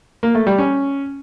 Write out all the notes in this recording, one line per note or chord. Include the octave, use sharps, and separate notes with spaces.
A#3
A3
G3
C#4